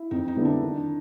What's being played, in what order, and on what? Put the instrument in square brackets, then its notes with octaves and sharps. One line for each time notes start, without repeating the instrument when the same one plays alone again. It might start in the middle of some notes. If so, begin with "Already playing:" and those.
Already playing: [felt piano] E4
[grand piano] F2 [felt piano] D#4
[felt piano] D#4
[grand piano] D3 G3 B3 E4
[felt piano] D4
[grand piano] D#3